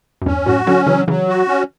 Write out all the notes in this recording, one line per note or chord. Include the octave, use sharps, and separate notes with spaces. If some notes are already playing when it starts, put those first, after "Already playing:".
F#2
E2 G2 C#4
F#2 A2 F#4
D3 F#3 C#4
C#3 E3 F#3
C#3 E3 F#3
F#4
C#4